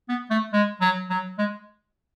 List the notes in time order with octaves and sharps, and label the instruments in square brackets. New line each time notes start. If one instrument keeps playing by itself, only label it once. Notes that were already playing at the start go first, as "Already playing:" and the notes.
[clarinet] B3
A3
G#3
F#3
F#3
G#3